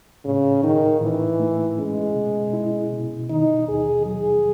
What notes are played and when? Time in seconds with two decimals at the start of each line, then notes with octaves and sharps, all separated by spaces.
0.25 A2 C#3
0.63 D#3 D#4
1.01 A2 E3
1.40 A3
1.78 G#3 C#4
2.16 B2
2.53 E4
2.92 B2
3.30 D#3 D#4
3.67 D#2 G#4
4.06 F#3 G#4